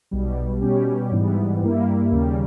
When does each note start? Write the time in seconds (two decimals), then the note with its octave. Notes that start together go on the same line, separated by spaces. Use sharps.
0.11 B1 B2 G3
0.61 B2 G3 C#4 G4
1.12 G#2 E3 G3 B3
1.62 G2 G3 A#3 E4
2.12 D#2 C#3 G3 A#3